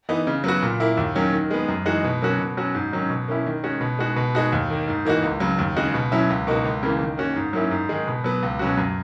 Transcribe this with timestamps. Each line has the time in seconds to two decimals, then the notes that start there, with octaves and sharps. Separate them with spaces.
0.09 E3 B3 D#4
0.27 C#3
0.44 F#3 B3 F#4
0.63 A#2
0.80 A#3 E4
0.97 D#2
1.15 D#3 F#3 C#4
1.33 D#3
1.51 G#3 B3
1.68 F#2
1.86 E3 G#3 D#4 F#4
2.04 B2
2.22 F#3 A#3 C#4 F#4
2.39 B2
2.57 F#3 C#4 F#4
2.75 G#2
2.92 D#3 F#3 C#4
3.10 B2
3.28 A#3 C#4 E4
3.46 D#3
3.64 G#3 C#4 F#4
3.81 B2
3.99 G#3 D#4 F#4
4.16 B2
4.35 G#3 D#4 F#4
4.52 D#2
4.70 D#3 A#3
4.88 G#2
5.05 E3 A#3 D#4 F#4
5.23 C#2
5.40 C#3 F#3
5.58 D#2
5.76 C#3 G#3 D#4 F#4
5.94 B2
6.12 F#3 C#4 E4
6.30 C#2
6.47 B2 A#3 D#4 F#4
6.65 C#2
6.83 C#3 E3 A#3
7.01 D#3
7.18 A#3 C#4 F#4
7.36 G#2
7.53 F#3 A#3 C#4 E4
7.71 G#2
7.89 D#3 G#3
8.07 B2
8.24 F#3 B3
8.42 C#2
8.59 B2 F#3 C#4 F#4
8.77 F#2